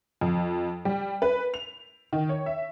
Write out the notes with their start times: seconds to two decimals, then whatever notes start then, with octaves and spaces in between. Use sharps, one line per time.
0.21 F2
0.85 G3
1.22 B4
1.54 F7
2.13 D#3
2.29 C#5
2.46 E5